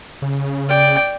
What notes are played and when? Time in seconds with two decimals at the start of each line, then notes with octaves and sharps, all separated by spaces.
0.22 C#3
0.69 D5 G5